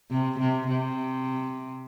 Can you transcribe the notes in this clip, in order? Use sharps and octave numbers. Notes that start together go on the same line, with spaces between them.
C3
C3
C3